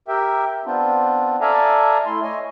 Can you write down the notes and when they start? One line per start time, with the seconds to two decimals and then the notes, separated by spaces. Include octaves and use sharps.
0.08 G4 A#4 E5 G5
0.65 B3 C4 D4 F4
1.41 A4 D5 E5 F5 G#5 A#5
2.06 A3 E4 C6
2.23 C#5 D#5 G#5